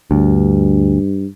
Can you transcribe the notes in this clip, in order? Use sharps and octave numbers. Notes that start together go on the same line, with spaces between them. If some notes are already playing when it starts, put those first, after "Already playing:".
D2 G2